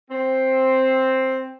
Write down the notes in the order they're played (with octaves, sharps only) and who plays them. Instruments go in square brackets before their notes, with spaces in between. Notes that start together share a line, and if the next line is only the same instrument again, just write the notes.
[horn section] C4